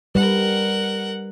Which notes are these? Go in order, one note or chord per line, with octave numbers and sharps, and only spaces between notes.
G3 A#4 B4 F#5